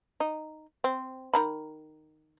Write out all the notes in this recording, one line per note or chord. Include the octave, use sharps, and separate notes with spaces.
D#4
C4
D#3 A#5 B5